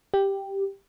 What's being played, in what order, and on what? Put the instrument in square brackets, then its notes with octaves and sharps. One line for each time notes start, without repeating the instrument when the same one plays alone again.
[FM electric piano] G4